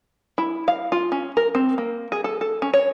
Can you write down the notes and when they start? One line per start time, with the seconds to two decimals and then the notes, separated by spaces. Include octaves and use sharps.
0.38 E4
0.68 F5
0.92 F4
1.12 C#4
1.37 A#4
1.55 C4
1.78 A#3
2.12 G#4
2.24 A4
2.41 A4
2.62 C#4
2.74 C#5